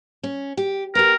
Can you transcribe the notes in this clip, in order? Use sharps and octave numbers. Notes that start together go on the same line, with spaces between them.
C#4
G4
B3 G4 A#4